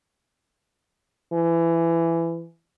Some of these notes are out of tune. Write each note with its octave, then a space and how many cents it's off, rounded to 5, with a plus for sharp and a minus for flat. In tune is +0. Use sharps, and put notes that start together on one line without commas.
E3 +20